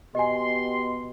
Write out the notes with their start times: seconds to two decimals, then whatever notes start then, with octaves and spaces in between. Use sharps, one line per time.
0.15 B2 G4 D#5 G#5 C6